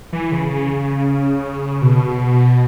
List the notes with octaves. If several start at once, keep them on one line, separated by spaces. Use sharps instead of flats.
E3
C#3
C#3
B2